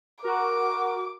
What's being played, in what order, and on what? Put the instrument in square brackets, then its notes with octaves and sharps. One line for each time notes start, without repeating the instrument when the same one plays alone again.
[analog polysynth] F#4 A#4 [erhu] D6